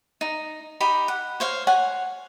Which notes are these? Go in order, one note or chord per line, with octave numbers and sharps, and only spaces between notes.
D#4
D#4 G4 B5
F#5
C5 C#5 F5
C#5 F#5 G#5